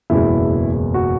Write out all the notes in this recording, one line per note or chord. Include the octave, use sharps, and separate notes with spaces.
F#1 E2 B2 G#3 E4
F#4